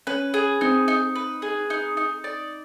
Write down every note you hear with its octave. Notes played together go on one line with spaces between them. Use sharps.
C#4 B4
G#4
C4 D#4
D#4
B4
G#4
D#4
D#4
D5